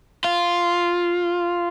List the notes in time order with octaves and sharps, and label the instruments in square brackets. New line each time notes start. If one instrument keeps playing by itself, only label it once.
[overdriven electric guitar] F4